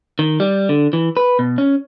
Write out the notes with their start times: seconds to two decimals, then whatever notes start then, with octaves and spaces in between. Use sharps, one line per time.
0.19 D#3
0.40 G3
0.69 D3
0.93 E3
1.17 B4
1.39 B2
1.58 C#4